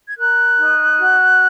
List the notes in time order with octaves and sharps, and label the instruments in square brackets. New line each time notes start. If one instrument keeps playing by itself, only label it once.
[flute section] G#6
A#4 F#6
D#4
F#4